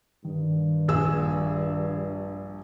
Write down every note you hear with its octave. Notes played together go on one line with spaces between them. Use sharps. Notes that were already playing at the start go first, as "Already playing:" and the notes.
G2 D#3
A#1 G#4 E6